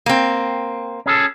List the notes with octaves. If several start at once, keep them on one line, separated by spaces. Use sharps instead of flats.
A#3 C4
C#4 G#4 A4